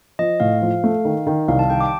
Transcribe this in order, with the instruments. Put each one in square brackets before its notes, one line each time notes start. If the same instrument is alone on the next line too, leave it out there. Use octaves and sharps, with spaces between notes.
[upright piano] F3 [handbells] D#5
[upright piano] A2 [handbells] F5
[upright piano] F3
A3
D#3
D#3
[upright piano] C2 [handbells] F5
[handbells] A5
[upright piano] D#3 [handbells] G5
[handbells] D6